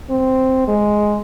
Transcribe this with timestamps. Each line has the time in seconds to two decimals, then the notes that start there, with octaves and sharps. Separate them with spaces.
0.10 C4
0.68 G#3